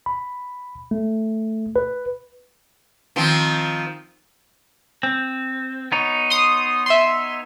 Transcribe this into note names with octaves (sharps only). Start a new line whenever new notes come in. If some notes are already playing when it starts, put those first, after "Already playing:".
B5
A3
B4
D#3 F3 C4
C4
B3 D#4 C#5
C6 D#6
E5 C6